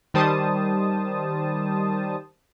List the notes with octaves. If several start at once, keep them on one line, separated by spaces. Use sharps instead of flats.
D#3 G3 C5 A5 D#6